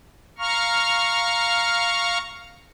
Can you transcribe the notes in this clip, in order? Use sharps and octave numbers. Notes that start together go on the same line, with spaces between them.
F5 A#5 C#6 F6